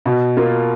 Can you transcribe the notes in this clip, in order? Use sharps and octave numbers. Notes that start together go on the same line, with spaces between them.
B2
A#3 F4